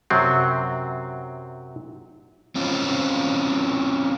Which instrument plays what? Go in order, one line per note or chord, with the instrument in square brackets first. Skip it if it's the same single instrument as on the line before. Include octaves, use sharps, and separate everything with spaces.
[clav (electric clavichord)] F#2 C3 F#3 C4
[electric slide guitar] C4 C#4 F4